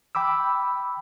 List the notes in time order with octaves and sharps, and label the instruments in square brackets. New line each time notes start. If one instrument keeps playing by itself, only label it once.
[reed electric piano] G5 B5 D6 E6